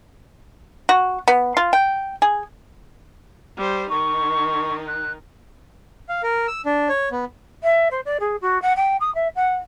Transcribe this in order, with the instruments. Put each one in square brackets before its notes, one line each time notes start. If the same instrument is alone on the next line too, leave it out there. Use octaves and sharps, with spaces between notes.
[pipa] F#4
B3
F4
G5
G#4
[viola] G3 C5
[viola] D#3 D#4 [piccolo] C#6
[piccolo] F#6
[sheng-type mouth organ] F5
A#4
E6
D4
C#5
B3
[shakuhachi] E5
C5
D5
G#4
F#4
F#5
G5
D#6
E5
F#5